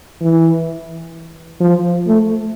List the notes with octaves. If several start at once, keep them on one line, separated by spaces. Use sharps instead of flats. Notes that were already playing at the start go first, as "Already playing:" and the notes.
E3
F3
A3